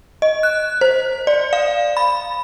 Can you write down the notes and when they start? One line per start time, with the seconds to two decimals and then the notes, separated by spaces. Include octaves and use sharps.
0.22 D#5
0.43 F#6
0.81 C5
1.27 D5
1.53 F5
1.97 B5